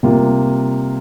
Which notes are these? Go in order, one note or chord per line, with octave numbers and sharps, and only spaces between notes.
C3 G3 A#3 F4